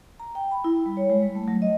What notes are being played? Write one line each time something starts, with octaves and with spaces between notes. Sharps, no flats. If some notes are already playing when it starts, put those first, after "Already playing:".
A#5
G5
B5
E4
G3
C#5
G#3
G3
A3
F#3
D#5